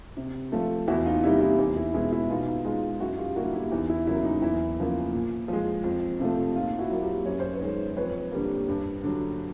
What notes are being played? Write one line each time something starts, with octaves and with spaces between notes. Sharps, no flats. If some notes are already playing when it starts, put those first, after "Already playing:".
C3
F3 A3
E2 E4 F#4
D#4 F4
C3 D#3 G3 A#3 E4
E4
E2 D#4
E4
B2 G#3 E4
E4
B2 D#4 F4
D#4 F4
G#3 D#4 F4
F#2 E4 F#4
F4 G4
D3 G3 A#3 E4 F#4
E4
E2 D#4
E4
C#3 F#3 A#3 E4
D#4
E2 E4
C#3 F3 A#3
A#2
F3 G#3
F2
C3 F3 A3
A#2 D#4 F4
E4 F#4
F#3 A#3
F4 G4
F#2 C#5
C5
B4 C#5
D#3 G#3
F2 B4 C#5
D3 G3 A#3
G2
D3 F#3